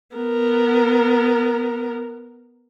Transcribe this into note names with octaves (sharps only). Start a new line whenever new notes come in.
B3 A#4